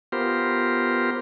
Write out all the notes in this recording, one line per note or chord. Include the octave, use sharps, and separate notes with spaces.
B3 F4 G4 A#4 C5